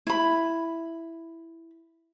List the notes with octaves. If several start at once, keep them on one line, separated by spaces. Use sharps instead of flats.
E4 B5